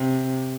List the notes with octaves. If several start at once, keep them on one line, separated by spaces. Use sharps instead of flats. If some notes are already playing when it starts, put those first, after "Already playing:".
Already playing: C3